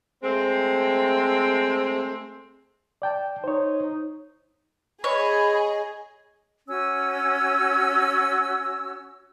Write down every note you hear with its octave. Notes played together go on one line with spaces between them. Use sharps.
G#3 A3 C4
D5 G5 A5
D#4 C5 C#5
G#4 C#5 D#5 B5
C#4 F#4 E6